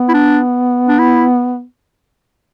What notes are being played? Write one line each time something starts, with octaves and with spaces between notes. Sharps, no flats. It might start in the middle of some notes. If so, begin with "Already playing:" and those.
Already playing: B3
E4
D4
D4
E4